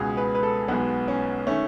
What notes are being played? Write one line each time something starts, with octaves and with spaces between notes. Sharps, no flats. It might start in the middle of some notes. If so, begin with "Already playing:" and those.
Already playing: C#2 B2 G#3 G#4
B4
B4
A4
B1 B2 G#3 B3
C#4
D#3 A3 C#4